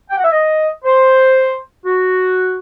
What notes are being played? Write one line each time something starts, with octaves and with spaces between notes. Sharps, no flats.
G5
F#5
E5
D#5
C5
F#4